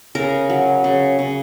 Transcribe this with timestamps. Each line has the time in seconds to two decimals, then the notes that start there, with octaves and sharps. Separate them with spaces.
0.15 C#3 A#4
0.50 F#3
0.84 C#3
1.19 C#3